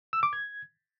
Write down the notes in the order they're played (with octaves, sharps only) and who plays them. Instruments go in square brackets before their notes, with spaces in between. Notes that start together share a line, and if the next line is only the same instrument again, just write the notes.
[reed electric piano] E6
D6
G#6